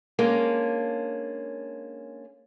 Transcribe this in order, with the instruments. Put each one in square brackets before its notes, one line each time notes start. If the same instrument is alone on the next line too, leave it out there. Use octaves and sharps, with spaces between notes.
[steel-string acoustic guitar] G#3 A#3 C#4 D4